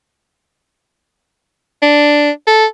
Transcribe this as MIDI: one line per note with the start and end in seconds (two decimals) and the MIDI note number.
1.82 2.30 62
2.47 2.65 69